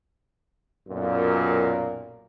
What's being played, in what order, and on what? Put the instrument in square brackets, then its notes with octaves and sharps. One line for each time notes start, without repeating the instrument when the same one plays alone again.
[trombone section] B1 F#2 A#2